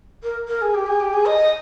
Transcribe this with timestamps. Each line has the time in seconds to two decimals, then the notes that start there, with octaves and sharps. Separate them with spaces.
0.23 A#4
0.47 A#4
0.61 G#4
0.74 G4
0.87 G#4
1.00 G4
1.13 G#4
1.26 D#5